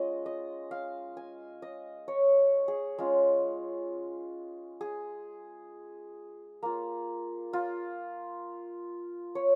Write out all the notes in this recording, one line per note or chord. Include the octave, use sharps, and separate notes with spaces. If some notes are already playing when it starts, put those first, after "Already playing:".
Already playing: G#3 C#4 F4 D#5
D#5
F5
G#5
D#5
C#5
G#4
G#3 C#4 F4
G#4
A#3 F4
F4
C#5